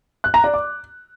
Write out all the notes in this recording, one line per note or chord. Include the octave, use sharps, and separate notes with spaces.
F#6
A#5
D5
D6